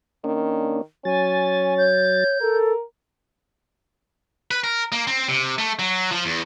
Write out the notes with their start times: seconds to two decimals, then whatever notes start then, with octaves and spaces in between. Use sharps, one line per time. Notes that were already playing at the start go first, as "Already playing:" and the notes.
0.24 D#3 A#3 C#4 D4
1.05 F#3 C#4 G#5 A6
1.78 C#5 G6
2.41 A4 A#4
4.51 B4
4.64 A#4
4.92 A#3
5.07 C4
5.29 C3
5.58 A3
5.79 F#3
6.11 F3
6.25 E2